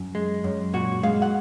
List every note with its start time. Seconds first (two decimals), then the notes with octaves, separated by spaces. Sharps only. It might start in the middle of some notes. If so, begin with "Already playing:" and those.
Already playing: F#2
0.15 G#3
0.44 F#2
0.74 A#2 F#4
1.03 G#3 F5
1.22 F#5